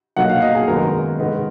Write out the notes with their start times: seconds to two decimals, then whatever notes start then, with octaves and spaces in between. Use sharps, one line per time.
0.16 B2 F#3 A#3 D#4 F#5
0.29 F5
0.42 D#5
0.55 G#4
0.68 F#2 D#3 G#3 B3 D#4 A#4
1.18 D#3 G#3 B3 D#4